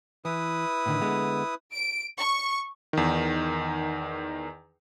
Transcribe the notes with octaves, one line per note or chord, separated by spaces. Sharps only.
E3 E4 B4 D#6
A2 D3 D#3
D3 G#3 B3
D7
C#6
E2 D#3